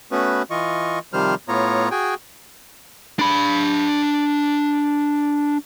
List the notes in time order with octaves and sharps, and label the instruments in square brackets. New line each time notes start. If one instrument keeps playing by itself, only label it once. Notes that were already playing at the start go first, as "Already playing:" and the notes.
[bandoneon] A3 B3 C#4 F#4 B4
E3 F4 D#5 C#6
C3 D#3 F3 G3 C5 F6
A2 B3 F4 C#5 A#5
F#4 G#4 G5 G#5
[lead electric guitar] D4 B5